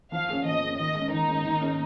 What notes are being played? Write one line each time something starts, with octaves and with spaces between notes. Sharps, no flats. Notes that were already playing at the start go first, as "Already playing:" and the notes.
F3 F5
C#4 G#4
F3 D#5
C#4 G#4
D#3 D#5
G#3 C#4
D#3 D#4
G#3 C#4
D#3
C#4 G#4